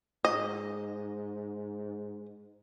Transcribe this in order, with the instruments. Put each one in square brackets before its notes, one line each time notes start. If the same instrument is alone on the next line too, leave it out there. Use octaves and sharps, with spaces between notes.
[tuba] G#2 [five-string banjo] D#5